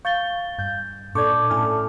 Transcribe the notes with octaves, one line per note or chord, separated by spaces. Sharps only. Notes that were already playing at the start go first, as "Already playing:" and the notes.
F5 C#6 G6 A6 G7
G2 G6
A#2 D4 A4 D5 C#6 D6 G6 G#6
A2 C#4 G#5 F6